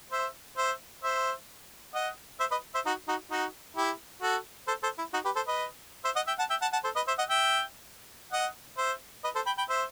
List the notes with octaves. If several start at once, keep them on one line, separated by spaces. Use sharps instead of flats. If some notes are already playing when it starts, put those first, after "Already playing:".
C5 E5
C5 E5
C5 E5
D#5 F#5
C5 E5
B4 D#5
C5 E5
D#4 F#4
D#4 F#4
D#4 F#4
E4 G4
F#4 A4
A4 C5
A4 C5
E4
D#4 F#4
G4 B4
A4 C5
B4 D#5
C5 E5
D#5 F#5
E5 G5
F#5 A5
E5 G5
F#5 A5
F#5 A5
A4 C5
B4 D#5
C5 E5
D#5 F#5
E5 G5
D#5 F#5
C5 E5
B4 D#5
A4 C5
G5 B5
G5 B5
C5 E5